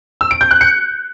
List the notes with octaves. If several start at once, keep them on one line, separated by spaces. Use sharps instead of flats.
E6
D7
G6
F#6
C#7